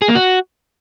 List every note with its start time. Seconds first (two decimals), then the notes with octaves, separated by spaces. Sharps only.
0.02 G#4
0.08 A#3
0.15 F#4